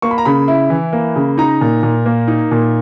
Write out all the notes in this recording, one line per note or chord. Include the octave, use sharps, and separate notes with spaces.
A#3 C#6
B5
A#5
C#3 B5
E4
E3
A#3
C#3
D#4 A#5
A#2
A#2
A#3
D#4
A#2